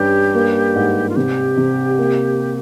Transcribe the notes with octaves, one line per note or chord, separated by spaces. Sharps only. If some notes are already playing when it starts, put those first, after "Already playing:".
Already playing: G2 C#4 G4
A#3
G#2
F4
C3 G4
C3
A#3